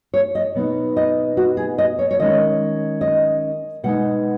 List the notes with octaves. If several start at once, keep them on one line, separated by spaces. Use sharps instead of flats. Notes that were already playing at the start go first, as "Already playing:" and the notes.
C#5
D#5
B2 B3 D#4
D#5
F#4
G#4
D#5
C#5
C#5
D#3 G#3 C#4 D#5
D#5
B2 G#3 D#4 F#5